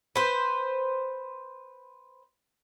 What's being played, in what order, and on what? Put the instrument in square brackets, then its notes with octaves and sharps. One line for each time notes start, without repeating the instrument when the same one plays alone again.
[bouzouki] B4 C5